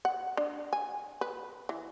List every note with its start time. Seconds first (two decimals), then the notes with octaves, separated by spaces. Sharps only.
0.05 F#5
0.37 D4
0.73 G#5
1.21 B4
1.69 E3